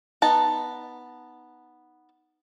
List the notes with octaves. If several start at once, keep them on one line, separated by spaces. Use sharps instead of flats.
B3 D#4 A5 A#5